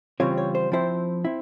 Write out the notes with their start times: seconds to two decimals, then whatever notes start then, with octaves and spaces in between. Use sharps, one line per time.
0.20 C#3 E3 G3 C4 F4 C#5
0.38 C#5
0.55 C5
0.72 F3 C4 E4 C5
1.25 C4 E4